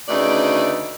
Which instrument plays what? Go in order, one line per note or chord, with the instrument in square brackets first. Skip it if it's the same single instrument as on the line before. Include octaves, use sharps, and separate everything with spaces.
[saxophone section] D2 C#3 A3 D#4 B4 D5